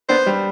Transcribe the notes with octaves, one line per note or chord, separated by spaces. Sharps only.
B3 D4 C5
G3